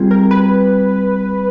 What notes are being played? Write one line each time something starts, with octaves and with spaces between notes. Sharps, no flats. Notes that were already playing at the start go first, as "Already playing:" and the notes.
Already playing: G3 C4 F4 G#4
A#4
B4